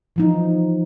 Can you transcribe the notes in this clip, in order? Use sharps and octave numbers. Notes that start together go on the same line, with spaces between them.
E3 F3 D#4